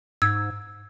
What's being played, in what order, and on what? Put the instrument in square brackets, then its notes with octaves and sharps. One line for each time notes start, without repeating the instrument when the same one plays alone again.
[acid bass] G#2 [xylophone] E6 G#6